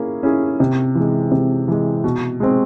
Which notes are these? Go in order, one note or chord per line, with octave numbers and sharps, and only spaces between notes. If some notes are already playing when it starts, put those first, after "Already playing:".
Already playing: A#3 C#4 E4 G#4
C#4 E4 G#4
C3
E3 G#3
C3
E3 G#3
B2
G#3 C4